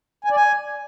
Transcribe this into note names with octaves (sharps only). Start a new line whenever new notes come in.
G#5
D5
G#5